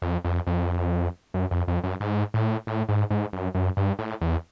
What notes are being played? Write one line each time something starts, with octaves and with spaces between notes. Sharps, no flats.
F2
F2
F2
F#2
F2
F2
F#2
G#2
A2
A2
G#2
G#2
F#2
F#2
G2
A2
E2